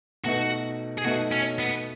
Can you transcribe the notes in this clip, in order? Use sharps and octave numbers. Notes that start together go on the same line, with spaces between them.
B2 A3 D#4 F#4
G#4
B2 A3 D#4 F#4
C#4
B3